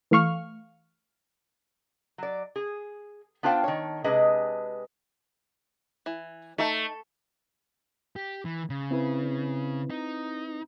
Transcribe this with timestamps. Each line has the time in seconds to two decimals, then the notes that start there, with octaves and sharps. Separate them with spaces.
0.11 E3 A3 F5 C#6 F6
2.18 F#3 D5
2.56 G#4
3.43 B3 D4 F4 C5 F5 G5
3.64 D#3 C#5
4.04 C3 G#3 D4 G#4 B4 D#5
6.06 E3
6.58 A3 D#4 E5 A5
8.16 G4
8.45 E3
8.70 C#3
8.91 C4 E4 B4
9.90 D#4